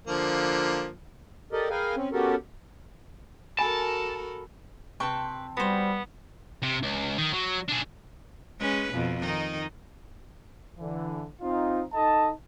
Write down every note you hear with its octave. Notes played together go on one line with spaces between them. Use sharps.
D3 F3 A#3
G4 A4 A#4 D5 D#5
G#4 A#4 B4 F5 G5 G#5
C4 C#4
B3 C#4 F#4 G4 A4 A#4
F#4 A4 A#4 G#5 A5 B5
C3 C4 B4 G5 A5 C#6
G3 B3 F#4 C5
C3
C#2
D#3
F#3
D4 G#4
G#3 C#4 B4
F2 B2
D#3 D#4
D3 E3
C4 D#4 F4
D#4 A4 D#5 A5